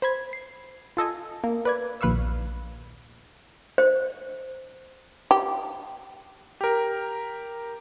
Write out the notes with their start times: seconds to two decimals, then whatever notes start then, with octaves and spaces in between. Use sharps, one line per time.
0.02 C5 B5 G#6
0.33 C7
0.97 F4 A4 D#5 G#5
1.44 A#3
1.65 B4 D5 G#6
2.01 A#1 D#2 B4 F5 C#6 E6
3.78 C5
5.31 G4
6.61 G4 A#4